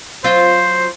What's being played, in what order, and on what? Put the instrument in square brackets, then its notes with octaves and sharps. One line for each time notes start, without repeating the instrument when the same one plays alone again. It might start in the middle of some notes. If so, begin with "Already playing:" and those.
[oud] F#3 C4 F4 [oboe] C5